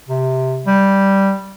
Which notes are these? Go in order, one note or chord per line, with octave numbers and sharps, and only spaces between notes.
C3
G3